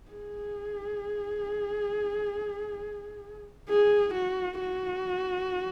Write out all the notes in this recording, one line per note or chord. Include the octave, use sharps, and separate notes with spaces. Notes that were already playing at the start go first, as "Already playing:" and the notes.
G#4
G#4
F#4
F#4